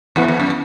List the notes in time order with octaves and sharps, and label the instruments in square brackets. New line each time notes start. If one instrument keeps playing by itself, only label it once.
[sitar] E2 [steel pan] B3 E4 B4 F#5
[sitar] E2
F#2